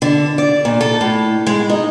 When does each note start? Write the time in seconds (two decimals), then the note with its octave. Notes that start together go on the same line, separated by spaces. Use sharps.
0.02 D3
0.38 D5
0.65 A#2
0.81 A4
1.01 A2
1.47 G#3
1.69 D#4